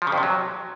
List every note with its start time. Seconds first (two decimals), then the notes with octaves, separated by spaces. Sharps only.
0.02 F3
0.07 C#3
0.12 F2
0.18 C3
0.23 F#3